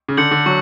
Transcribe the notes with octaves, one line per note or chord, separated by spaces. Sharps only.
C#3
D3 G6 C#7 F#7
D3
F#3 C#6